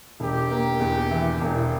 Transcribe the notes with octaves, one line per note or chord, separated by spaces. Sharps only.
E1 G4
A#3
E2
E3
E1 G4